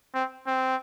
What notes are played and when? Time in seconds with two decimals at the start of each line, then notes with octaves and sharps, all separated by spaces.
0.14 C4
0.47 C4